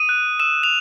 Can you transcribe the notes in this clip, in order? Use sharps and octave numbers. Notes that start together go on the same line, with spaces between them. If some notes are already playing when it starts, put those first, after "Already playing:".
Already playing: D#6 D#7
F#6
E6 E7
F7